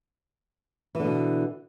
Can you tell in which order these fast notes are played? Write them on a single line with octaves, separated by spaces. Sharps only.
E3 D3 B2